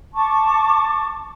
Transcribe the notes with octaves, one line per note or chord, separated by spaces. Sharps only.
A5 C#6 D6